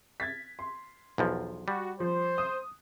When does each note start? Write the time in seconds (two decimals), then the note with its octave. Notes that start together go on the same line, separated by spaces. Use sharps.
0.20 G#6 A6 B6
0.59 C6
1.18 B1 E2 F3
1.68 G3 F#4
2.00 F3 C5
2.38 D#6